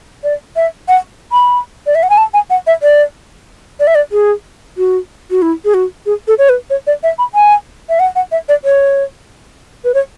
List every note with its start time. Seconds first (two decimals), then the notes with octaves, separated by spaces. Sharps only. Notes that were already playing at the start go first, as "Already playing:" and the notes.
0.23 D5
0.56 E5
0.88 F#5
1.32 B5
1.86 D5
1.95 E5
2.03 F#5
2.10 G#5
2.17 A5
2.34 G#5
2.50 F#5
2.67 E5
2.82 D5
3.80 D5
3.87 E5
3.95 D5
4.12 G#4
4.77 F#4
5.30 F#4
5.42 E4
5.65 G#4
5.74 F#4
6.06 G#4
6.28 A4
6.38 C#5
6.49 B4
6.70 C#5
6.87 D5
7.03 E5
7.18 B5
7.35 G#5
7.89 E5
7.99 F#5
8.15 F#5
8.32 E5
8.49 D5
8.64 C#5
9.84 B4
9.94 C#5